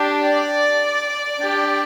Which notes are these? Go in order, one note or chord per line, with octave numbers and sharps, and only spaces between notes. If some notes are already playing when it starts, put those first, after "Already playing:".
Already playing: D4 G4
D5
D4 G4